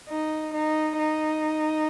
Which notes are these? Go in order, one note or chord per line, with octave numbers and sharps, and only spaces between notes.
D#4
D#4
D#4